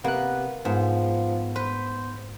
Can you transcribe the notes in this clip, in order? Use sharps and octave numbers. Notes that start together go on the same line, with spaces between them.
C3 A#3 B3 F#6
G#2 F3 B3
B4 C5